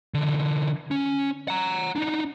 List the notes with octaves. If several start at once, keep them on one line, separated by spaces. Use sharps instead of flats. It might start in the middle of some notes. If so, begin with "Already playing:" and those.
D3 E3
C#4
F#5 A#5
D4 D#4